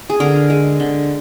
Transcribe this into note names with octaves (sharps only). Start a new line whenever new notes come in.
G#4
D3 A#4
G#3
D3